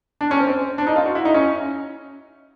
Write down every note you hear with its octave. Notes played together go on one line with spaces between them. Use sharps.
D4
C#4
C4
D4
D#4
F4
F#4
E4
D#4
C#4